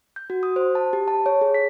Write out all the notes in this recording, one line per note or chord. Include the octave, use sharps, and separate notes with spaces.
G6
F#4
D#6
C5
A5
G4
A5
C#5
G#4
B6